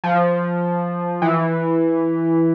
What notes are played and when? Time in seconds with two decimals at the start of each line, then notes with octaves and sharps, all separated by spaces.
0.04 F3
1.22 E3